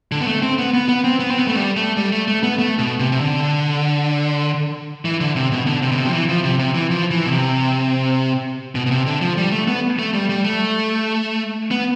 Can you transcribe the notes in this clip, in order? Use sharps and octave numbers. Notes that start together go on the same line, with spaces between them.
D3
B3
A3
C4
B3
B3
B3
C4
B3
C4
B3
A3
G3
A3
G3
A3
A3
B3
A3
B2
C3
C3
D3
E3
D3
C3
B2
D3
C3
B2
C3
F3
E3
F3
C3
C3
E3
F3
E3
B2
C3
B2
B2
C3
D3
F3
G3
A3
B3
A3
G3
G3
A3
B3